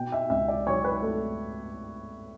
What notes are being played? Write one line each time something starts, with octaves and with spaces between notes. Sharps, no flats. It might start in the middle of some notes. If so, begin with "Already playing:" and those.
Already playing: B2 G5
E5
C#2 E5
D5
F#3 C#5
B4
A3 A4